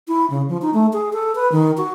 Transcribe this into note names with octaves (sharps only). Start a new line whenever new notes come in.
E4
C#3
F3
D#4
A3
G#4
A4
B4
D#3
F#4